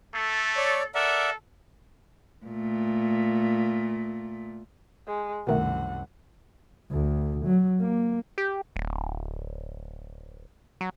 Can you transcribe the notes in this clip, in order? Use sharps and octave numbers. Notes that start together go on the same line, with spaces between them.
A3 A4
C#5 D5
A4 A#4 D5 E5 F#5
A#2 A3
G#3
C2 F#2 B2 D#3 A3 F#5
D2
F#3
A#3
G4
D1
F#3